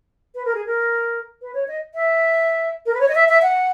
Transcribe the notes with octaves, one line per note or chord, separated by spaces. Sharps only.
B4
A#4
G#4
A#4
B4
C#5
D#5
E5
A#4
B4
C#5
D#5
E5
E5
F#5